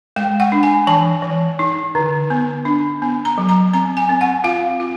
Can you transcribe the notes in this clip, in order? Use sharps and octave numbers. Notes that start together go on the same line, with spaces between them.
G#3 G5
F#5
D4
G#5
E3 A5
E3
D#4
D3
B3
D4
B3
A#5
F#3
A#5
C4 A#5
G#5
C4
F#5
F4 F5
F4